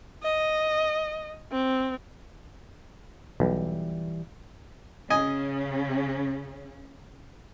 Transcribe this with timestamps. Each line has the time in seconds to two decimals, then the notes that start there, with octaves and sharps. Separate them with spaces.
0.23 D#5
1.52 C4
3.40 B1 E3 G3
5.10 C#3 C#4 D#5 G#5